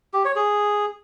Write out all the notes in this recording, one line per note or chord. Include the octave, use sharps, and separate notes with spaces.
G4
C#5
G#4